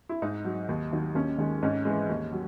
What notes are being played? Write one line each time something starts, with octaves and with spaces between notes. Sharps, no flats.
E4
G#2 D#4
F#3
D#2
D#3 F#3
D#2 C#4
D#3 G#3
G#2 C#4
E3 G#3
D#2
F#3